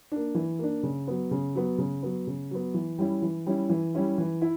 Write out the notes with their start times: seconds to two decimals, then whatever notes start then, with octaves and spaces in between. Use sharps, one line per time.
0.12 A#3 D4
0.35 E3
0.59 A#3 D4
0.83 C#3
1.07 F#3 B3
1.31 C#3
1.55 F#3 B3
1.78 C#3
2.03 F#3 B3
2.27 C#3
2.51 F#3 B3
2.74 E3
2.98 G3 C#4 E4
3.22 E3
3.46 G3 C#4 E4
3.70 E3
3.94 G3 C#4 E4
4.18 E3
4.42 E4